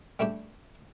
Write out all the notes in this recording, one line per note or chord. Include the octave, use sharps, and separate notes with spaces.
G3 A3 D4 G4